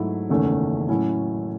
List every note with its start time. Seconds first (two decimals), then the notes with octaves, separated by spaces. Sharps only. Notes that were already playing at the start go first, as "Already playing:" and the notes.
Already playing: G#2 F#3 A3 E4
0.29 F#1 E2 D#3 A3 C#4
0.88 A2 F#3 A3 C#4 E4